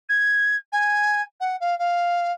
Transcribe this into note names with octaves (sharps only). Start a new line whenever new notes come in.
G#6
G#5
F#5
F5
F5